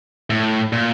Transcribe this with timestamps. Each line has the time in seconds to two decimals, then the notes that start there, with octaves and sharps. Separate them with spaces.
0.30 A2
0.73 A#2